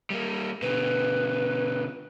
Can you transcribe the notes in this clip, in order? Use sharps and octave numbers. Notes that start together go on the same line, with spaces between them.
G3 A#3
B2 D3 B4